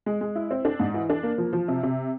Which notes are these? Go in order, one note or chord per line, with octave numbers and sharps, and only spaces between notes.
G#3
G#3
E4
C4
D4
G#2
E3
D4
A#3
F3
F3
C3
C3